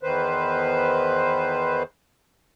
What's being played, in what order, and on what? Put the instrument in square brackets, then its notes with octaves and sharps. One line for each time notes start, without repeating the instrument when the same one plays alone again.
[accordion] E2 D#3 B4 C5